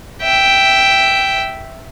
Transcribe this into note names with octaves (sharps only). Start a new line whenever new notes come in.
E5 G5